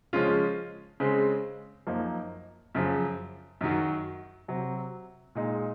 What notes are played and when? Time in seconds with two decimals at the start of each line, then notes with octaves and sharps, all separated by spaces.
0.13 C#3 F3 G#3 C#4 F4
1.00 C#3 G#3 C4
1.87 F#2 F3 A#3 D#4
2.75 F#2 C#3 F3
3.61 F#2 D#3 F#3
4.48 C3 F#3 C4
5.35 A#2 G#3 D#4